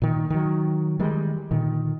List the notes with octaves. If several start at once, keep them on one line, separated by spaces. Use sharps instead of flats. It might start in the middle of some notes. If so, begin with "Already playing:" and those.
A#2 D#3
D#3 F#3
D#3 E3 G3 G#3
A#2 D3 D#3